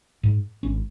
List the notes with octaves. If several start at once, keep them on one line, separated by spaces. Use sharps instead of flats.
G#2
G#1 C#4